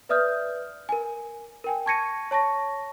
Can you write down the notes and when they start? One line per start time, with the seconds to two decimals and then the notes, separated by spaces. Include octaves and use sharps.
0.09 B4 D5 E5 D#6 F6 G6
0.89 A#4 G#5
1.64 A#4 G5 G#5
1.86 A5 C#6 G#6 A#6 C#7 D#7
2.31 C#5 A5 C#6 A#6